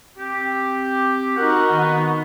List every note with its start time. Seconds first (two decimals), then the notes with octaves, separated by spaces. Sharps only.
0.18 C4 G4
1.37 D#4 F#4 A#4 F#5
1.71 D#3 B3